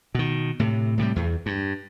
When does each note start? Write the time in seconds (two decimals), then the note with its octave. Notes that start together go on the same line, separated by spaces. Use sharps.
0.15 B2 D#3
0.59 A2 C3
0.98 A2 C3 D#3 G3
1.16 E2
1.46 G2